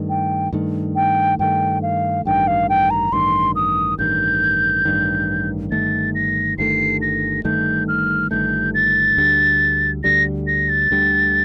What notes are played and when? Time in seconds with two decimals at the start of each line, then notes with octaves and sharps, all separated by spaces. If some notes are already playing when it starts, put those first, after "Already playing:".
Already playing: G2 D#3 A3
0.09 G5
0.53 G2 D#3 A3
0.96 G5
1.39 G2 D#3 A3 G5
1.82 F5
2.25 A1 G2 D#3 G5
2.47 F5
2.69 G5
2.90 A#5
3.12 A1 G2 D#3 C6
3.55 D#6
3.99 A1 G2 D#3 G6
4.85 A1 G2 D#3
5.71 G1 G2 D#3 A3 A6
6.15 A#6
6.58 G1 G2 D#3 A3 C7
7.02 A#6
7.44 G1 G2 D#3 A3 G6
7.88 F6
8.31 G1 G2 D#3 A3 G6
8.74 A6
9.17 D2 D3 G3
10.04 D2 D3 G3 A#6
10.47 A#6
10.69 A6
10.91 D2 D3 G3